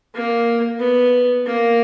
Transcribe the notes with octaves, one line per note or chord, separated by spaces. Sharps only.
A#3
B3
A#3